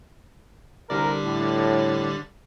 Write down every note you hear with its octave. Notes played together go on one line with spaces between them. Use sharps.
C2 D3 G3 A#4 D5
A2